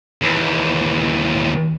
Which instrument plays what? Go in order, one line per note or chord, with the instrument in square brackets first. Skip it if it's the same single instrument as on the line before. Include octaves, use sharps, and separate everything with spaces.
[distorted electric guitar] D#2 E3